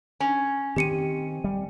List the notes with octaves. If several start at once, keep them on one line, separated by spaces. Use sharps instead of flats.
C#4
D#3 C4 G4 C#7 D#7
G3